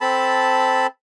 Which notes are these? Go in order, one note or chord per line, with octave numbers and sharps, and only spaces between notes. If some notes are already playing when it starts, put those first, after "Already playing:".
C4 A4 A5 B5